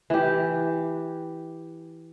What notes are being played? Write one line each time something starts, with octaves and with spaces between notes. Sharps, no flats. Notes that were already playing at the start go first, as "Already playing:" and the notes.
E3 G4